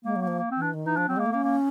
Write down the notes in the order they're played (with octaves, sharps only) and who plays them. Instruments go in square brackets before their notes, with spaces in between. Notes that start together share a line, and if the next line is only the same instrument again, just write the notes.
[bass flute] G#3 [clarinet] A#3
[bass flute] F#3
[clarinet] A#3
[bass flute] F3
[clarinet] A#3
C4
[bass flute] E3 [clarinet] D4
[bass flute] D#3
[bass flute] E3 [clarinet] D#4
[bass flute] F3 [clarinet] D4
[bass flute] F#3 [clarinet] C4
[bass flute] G#3 [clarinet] A#3
[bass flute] A3
[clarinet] A#3 [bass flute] C#4
[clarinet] A#3